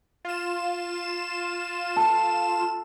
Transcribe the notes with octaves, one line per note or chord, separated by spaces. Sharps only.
F4 E7
A4